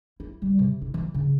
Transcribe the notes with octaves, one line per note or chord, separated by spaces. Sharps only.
E4
G3
C3
E4
E3
C#3